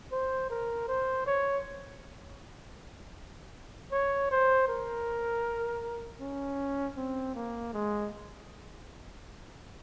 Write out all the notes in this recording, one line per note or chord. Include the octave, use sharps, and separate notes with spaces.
C5
A#4
C5
C#5
C#5
C5
A#4
C#4
C4
A#3
G#3